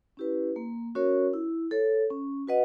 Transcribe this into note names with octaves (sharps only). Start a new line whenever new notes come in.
C#4 E4 G4 B4
A#3
C#4 F#4 A#4 C#5
E4
A4 C#5
C#4
F#4 B4 D#5 F#5